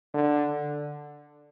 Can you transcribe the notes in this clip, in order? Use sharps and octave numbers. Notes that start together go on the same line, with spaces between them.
D3